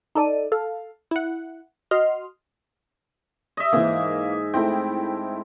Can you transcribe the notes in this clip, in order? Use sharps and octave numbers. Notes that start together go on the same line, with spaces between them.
D#4 A4 D5 D#7
A4 F5
E4 F#5
F#4 D#5 C6 F6
D#5 E5
G#2 E3 A#3
A3 C4 E4 G5